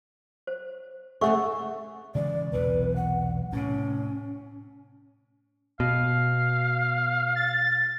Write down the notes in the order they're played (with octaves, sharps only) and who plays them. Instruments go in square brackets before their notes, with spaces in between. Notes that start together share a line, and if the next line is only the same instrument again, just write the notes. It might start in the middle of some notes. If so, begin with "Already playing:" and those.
[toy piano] C5
[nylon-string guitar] C#3 A3 G#4 [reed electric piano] A4 E5 F#5 [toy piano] C#6
[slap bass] C#3 E3 G#3 [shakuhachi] D5
[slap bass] B1 E2 C3 [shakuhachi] B4
[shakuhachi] F#5
[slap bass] A2 C3 [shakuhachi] C#4
[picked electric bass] B2 [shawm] F5
[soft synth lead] A6